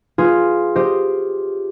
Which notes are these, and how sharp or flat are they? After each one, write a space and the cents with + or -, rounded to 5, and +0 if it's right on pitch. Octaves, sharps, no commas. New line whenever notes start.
F4 +0 G#4 +0 B4 +10
G4 +0 C5 +0 D#5 +0